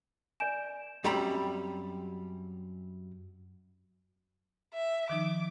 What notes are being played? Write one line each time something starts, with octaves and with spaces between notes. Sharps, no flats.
D5 G#5 G6 D7 E7
F#2 G3 C4 G5 A#5 B5
E5
D#3 F3 D#4 D6